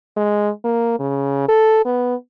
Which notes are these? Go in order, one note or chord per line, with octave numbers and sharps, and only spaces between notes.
G#3
A#3
C#3
A4
B3